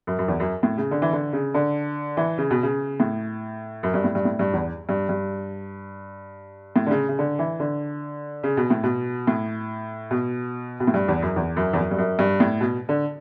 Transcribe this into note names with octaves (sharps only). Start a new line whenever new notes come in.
F#2
F#2
E2
F#2
A2
C#3
D3
E3
D3
C#3
D3
E3
C#3
B2
C#3
A2
F#2
G2
A2
G2
A2
G2
E2
G2
G2
A2
D3
C#3
C#3
D3
E3
D3
C#3
B2
A2
B2
A2
B2
B2
A2
G2
E2
F#2
E2
F#2
E2
F#2
G2
F#2
G2
A2
B2
D3